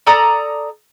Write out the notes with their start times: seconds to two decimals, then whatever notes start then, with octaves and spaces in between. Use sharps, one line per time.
0.07 A4 D5 A#5 D#6